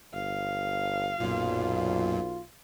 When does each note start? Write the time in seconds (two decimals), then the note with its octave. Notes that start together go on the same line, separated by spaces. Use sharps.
0.14 G1 F5
1.20 B1 F#2 A#2 F4